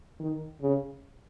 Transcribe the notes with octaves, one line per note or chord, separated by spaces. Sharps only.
D#3
C#3